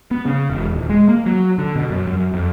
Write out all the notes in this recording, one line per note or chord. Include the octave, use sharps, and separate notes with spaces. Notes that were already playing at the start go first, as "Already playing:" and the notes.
B3
C#3
E1
D#1
G#3
A#3
F#3
D3
B2
F#2
F#2
F2